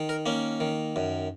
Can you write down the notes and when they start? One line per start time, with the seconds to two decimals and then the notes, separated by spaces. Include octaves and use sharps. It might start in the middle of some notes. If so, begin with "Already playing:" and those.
Already playing: D#3
0.09 A#4
0.26 A#3 C#4
0.60 D#3
0.96 F#2